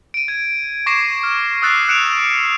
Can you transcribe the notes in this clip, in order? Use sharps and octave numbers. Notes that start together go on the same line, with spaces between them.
D7 D#7
G#6
C#6 D6 G#6 A#6 C7 E7
F6
D#6 E6 F#6 A6 C7
F#6 C#7 D7 E7 F7